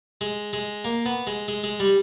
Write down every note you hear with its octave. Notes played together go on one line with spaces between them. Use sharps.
G#3
G#3
A#3
B3
G#3
G#3
G#3
G3